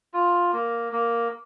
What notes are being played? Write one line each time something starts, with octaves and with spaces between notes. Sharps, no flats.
F4
A#3
A#3